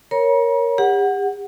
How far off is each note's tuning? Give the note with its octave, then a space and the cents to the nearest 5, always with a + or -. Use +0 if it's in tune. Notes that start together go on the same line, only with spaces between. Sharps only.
A#4 +0 C#5 +0 A#5 +45
G4 +40 F#5 +0